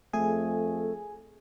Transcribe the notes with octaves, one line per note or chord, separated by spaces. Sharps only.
F2 A3 G#4 G#5